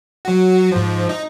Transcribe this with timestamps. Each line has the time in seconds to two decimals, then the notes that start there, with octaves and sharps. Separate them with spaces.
0.25 F#3 F#4
0.71 G#2 F3
1.09 D#4